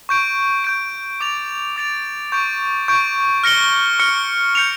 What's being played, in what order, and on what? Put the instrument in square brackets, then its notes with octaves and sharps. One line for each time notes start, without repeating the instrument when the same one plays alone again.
[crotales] C#6 G6 D7
C#6 G6 D7
D6 A6 D7 F7
D6 A6 D7 F7
C#6 G6 D7
C#6 G6 D7
F6 A#6 C#7 G7
F6 A#6 C#7 G7
G6 C#7 F7